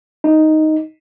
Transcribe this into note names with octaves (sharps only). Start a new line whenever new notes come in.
D#4